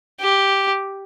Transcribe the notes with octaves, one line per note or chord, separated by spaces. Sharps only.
G4